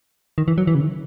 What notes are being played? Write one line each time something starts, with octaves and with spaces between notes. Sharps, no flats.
D#3
E3
F#3
E3
C#3
D#3